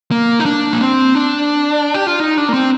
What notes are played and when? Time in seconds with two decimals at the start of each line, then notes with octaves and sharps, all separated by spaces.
0.11 A#3
0.40 D#4
0.46 D4
0.73 A#3
0.81 C4
1.15 D4
1.94 G4
2.07 F4
2.20 D#4
2.38 D4
2.49 A#3
2.54 C4